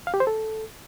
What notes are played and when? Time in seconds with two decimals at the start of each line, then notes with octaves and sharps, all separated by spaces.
0.07 F5
0.14 G4
0.20 C5
0.27 A4